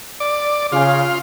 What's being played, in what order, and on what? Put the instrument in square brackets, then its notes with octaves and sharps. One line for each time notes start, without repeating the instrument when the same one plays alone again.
[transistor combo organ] D5
[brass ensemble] C#3 [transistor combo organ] F4